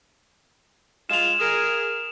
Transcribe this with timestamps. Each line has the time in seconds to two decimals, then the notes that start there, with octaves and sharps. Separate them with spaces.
1.10 G#3 F4 E7 F7
1.39 G#4 A#4